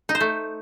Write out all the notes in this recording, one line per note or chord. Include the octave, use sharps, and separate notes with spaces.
D#4
C5
A3